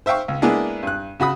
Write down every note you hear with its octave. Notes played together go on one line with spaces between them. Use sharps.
C5 E5 F5 G5 C#6
C#2
G#3 A#3 B3 D4 E4 G#4
G2 F#6
C#3 F#4 B5 D#6